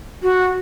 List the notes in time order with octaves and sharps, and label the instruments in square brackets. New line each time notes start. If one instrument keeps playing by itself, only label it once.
[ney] F#4